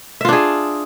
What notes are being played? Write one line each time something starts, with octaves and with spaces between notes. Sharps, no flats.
D4 F4 G#4 E5